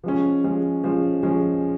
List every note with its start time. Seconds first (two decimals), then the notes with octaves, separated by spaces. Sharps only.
0.04 F3 G#3 C#4
0.44 F3 G#3 C#4
0.84 F3 G#3 C#4
1.23 F3 G#3 C#4